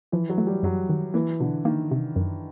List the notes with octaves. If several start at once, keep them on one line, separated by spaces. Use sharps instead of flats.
E3 F3
F#3
A3
G3
F#2 F#3
D#3
E3 A#3
B2 D3
D#3 A#3
C3
F#2